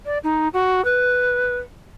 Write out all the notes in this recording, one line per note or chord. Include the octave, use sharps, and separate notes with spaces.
D5
D#4
F#4
B4